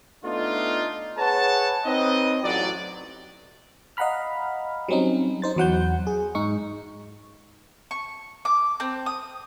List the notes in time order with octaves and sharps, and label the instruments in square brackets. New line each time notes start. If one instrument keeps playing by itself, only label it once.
[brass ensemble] A3 B3 D4 D#4 F4
G#4 B4 C#5 F#5 A5
C4 D#4 B4 C#5 D#5
A1 F#3 D5
[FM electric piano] D#5 F5 F#5 A#5 B5 F6
F#3 G3 C4 C#4 D#4
D#4 C5 A6
E2 F#3 F#5 G6
G#4
G#2 D#4 C#6
[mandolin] C#6
D6
C4
D#6